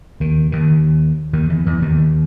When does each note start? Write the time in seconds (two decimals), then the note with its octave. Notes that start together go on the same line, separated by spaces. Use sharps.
0.20 D#2 D#3
0.52 D#2 D#3
1.33 D#2 D#3
1.49 E2 E3
1.65 E2 E3
1.82 D#2 D#3